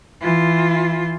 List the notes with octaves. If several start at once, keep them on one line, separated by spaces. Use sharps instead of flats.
E3 F4